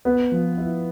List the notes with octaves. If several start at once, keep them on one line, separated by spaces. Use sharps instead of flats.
B3
F3
E4